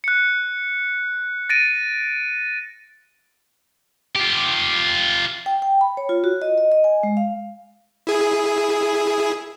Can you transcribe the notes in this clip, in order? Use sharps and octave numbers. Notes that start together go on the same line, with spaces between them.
F#6 C#7
A6 A#6 D7 D#7
F4 G4
G5
G5
B5
C#5
F4
F#4
D#5
D#5
D#5
G#5
G#3
F5
E4 G#4